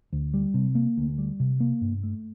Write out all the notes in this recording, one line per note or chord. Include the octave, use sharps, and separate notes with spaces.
D2
G3
C3
A#3
D2
G3
C3
A#3
G2
A3